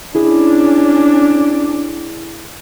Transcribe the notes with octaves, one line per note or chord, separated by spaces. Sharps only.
C#4 D4 E4 G#4